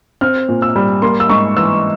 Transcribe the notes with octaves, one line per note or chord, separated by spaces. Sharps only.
C4 F6
A#2
E6
G3
A#3 C6
E6
G#2 C#6
E3 E6